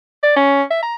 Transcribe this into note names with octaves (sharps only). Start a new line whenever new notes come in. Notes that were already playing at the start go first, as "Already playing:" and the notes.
D5
C#4
E5
A#5